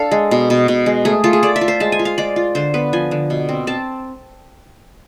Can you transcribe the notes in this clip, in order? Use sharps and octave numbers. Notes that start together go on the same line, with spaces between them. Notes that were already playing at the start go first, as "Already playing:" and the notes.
Already playing: D4 A4 F5
G#3
B2
B2
B2
G#3
A3 G#4
A3 F4
G#4
A3 D5
E5
F4
C5
G#3 A5
G#5
F4
F5
G#3 D5
F4
D3 C5
B3 B4
F3 G#5
D3
B2
C4
C4 A5